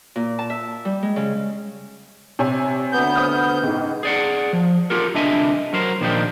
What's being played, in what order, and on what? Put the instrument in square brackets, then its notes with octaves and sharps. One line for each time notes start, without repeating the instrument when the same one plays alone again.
[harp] A#2
A5
E5
G3
G#3
C#3
[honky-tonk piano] C3 C#5 G#5
[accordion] D2 B3 G6
[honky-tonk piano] C5 D#6 F6
C#2 G#2
[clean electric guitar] G#4 D5 F#5
F3
F4 G4 A4 A#4
C2 D3 D4 D#5 E5 G#5
F#3 A#4 C5
A#2 D#3 F3 D4 D#4 G4